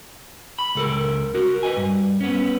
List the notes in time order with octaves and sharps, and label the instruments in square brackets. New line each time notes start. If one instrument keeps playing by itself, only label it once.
[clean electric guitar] B5
C#2 A4 A#4
F#4 A#4
B4 D#5 G#5
G2
B3 C#4